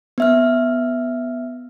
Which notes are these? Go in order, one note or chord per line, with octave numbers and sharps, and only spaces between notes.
B3 E5 F6